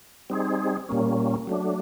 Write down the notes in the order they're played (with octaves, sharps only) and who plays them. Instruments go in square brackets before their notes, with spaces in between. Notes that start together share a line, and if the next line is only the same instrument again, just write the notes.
[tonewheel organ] G3 C4 D#4 G#4
A#2 G3 A#3 C#4
F#3 A3 D4